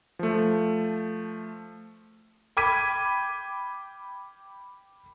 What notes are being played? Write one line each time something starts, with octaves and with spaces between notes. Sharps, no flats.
F3 A3
G5 B5 D6 G#6 B6 D#7